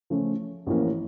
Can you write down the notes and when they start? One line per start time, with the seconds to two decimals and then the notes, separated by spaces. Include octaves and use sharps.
0.10 C#3 F3 A3 C#4
0.66 A1 A2 F3 A#3 C#4